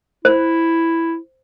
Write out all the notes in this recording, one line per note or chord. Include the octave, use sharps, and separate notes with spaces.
E4 C5